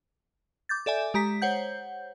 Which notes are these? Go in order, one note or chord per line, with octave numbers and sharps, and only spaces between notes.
D6 G6 A6
A4 D5 E5 G#5
G#3 G4 A#5 B6
C5 C#5 F#5 G6